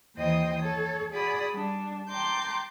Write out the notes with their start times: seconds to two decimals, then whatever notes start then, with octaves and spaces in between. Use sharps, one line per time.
0.17 D#2 E3 C5 D#5 G5 D#6
0.62 A4 C#5
1.13 F#4 G#4 D5 B5 D#6
1.53 G3 D4
2.09 G5 A5 A#5 C6 D6 G6